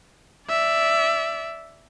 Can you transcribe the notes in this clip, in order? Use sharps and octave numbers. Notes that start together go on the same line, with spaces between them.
D5 E5